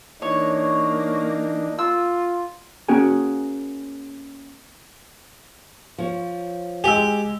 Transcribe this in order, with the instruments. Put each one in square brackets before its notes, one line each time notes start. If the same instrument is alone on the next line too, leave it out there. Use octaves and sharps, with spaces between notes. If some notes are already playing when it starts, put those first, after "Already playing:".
[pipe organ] E3 D4 D#4 [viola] A#3 [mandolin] C#5
[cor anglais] F4 [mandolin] E6
[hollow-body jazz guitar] A#3 C#4 F#4 G#4 G5 G#5
[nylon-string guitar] F3 C#5
[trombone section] G#3 [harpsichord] G4 [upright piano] G#5 E6